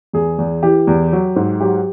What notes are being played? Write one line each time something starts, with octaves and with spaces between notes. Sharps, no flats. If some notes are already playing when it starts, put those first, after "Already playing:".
E2 G#4
E2
E3 G4
E2
F#3
G#2
F#3 G4